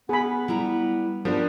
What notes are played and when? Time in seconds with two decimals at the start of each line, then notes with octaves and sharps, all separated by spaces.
0.09 B3 G#4 B5
0.48 G3 E4 A#5
1.25 F3 B3 D4 G4 A#4 C5